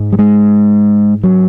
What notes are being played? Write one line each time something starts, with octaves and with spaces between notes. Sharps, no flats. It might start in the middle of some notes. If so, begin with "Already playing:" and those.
Already playing: G#2
G3
G#3
F#3